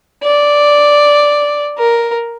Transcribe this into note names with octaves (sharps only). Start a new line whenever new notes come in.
D5
A#4